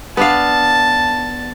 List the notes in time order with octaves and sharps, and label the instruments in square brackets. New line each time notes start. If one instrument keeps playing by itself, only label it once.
[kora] B3 D4 F5 [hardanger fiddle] A5